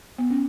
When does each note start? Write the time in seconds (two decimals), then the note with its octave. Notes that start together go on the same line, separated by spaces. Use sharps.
0.19 B3
0.30 C#4